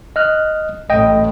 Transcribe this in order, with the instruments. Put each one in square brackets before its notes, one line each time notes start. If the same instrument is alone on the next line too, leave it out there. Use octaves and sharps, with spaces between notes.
[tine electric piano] D#5 F6 F#6
[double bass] A1 A2 [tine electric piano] D#5 G5